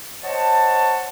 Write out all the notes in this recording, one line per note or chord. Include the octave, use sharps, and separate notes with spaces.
C5 C#5 D#5 F#5 A5